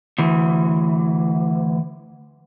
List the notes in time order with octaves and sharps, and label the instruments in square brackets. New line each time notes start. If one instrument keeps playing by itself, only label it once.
[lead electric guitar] D2 E3